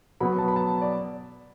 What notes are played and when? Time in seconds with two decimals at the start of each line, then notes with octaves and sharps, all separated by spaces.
0.20 B2 F#3 B3 B5
0.38 A5
0.48 B5
0.56 A5
0.82 D5